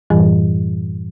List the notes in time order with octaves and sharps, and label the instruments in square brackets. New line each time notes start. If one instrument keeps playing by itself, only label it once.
[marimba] F#2 A2 E3 G3